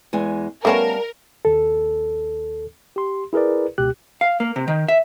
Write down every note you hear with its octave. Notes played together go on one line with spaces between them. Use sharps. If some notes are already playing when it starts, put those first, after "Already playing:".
E2 G#3 G#5
G3 A3 B3 C#4 A#4 F5 A5
D#2 A4
G4 C6
E4 G#4 A#4 B4 D5
C#2 B2 G4 F#6
F5
A#3
C3
D#3
E5